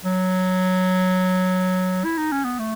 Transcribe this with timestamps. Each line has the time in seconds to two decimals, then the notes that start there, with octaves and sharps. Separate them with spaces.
0.05 F#3
2.05 E4
2.18 D#4
2.32 C#4
2.45 B3
2.59 A3